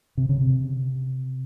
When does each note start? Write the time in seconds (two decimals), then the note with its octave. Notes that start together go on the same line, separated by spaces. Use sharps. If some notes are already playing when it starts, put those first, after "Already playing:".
0.17 C3
0.29 C#3
0.41 C3